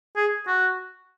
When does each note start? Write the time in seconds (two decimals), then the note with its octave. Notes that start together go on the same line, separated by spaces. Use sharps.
0.16 G#4
0.47 F#4